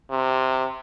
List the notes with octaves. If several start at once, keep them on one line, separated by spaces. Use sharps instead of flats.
C3